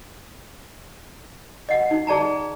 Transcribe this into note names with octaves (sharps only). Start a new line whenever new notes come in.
D#5 F#5
D#4
G#4 D5 A5 A#5